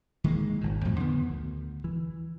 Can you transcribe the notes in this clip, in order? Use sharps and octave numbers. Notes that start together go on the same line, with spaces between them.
D#3 G#3 A#3
G#1 A#2
F2 A2 F3 F#3
D3 D#3 B3
D2
E3